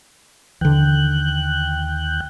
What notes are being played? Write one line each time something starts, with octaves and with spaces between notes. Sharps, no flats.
D#2 D3 E3 G5 F#6